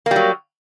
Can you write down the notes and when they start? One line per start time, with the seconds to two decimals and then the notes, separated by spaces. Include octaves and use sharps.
0.06 A#3
0.11 G3
0.16 F#3